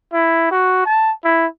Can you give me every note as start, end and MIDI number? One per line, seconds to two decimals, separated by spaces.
0.13 0.50 64
0.51 0.81 66
0.86 1.11 81
1.24 1.46 64